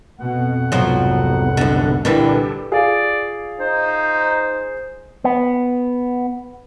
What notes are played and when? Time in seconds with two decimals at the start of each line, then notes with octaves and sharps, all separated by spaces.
0.20 F2 B2 F#5
0.72 C2 G#2 C3 F3 F#3 B3
1.57 F#2 D3
2.05 A#2 D3 E3 G3 G4 A4 A#4
2.72 F4 G#4 D5 F5
3.60 D#4 C5
5.24 B3